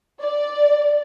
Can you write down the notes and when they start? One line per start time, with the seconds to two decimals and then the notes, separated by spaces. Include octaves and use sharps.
0.21 D5